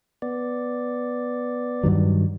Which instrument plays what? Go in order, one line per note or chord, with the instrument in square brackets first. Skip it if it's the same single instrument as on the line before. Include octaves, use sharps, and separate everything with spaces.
[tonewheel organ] B3 D5
[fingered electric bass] G2 D#3 F#3